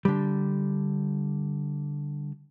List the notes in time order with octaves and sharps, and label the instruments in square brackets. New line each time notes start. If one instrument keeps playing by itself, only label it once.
[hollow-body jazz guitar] D3 G3